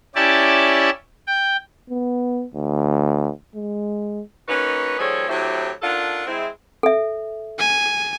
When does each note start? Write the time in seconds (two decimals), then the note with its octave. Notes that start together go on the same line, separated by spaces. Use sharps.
0.15 C#4 E4 G4 D5 A5
1.27 G5
1.90 B3
2.54 D2
3.56 G#3
4.48 A#3 C#4 D#4 F#4 B4
4.99 D#2 F3 G3 G#4 A4 C#5
5.29 A2 F#3 C4 D4 E4 G4
5.82 D#3 D4 F4 A4 F#5
6.26 G#3 C4 E4
6.83 A4 E5
7.59 G#5